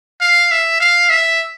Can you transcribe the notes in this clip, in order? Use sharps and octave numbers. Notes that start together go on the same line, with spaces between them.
F5
E5
F5
E5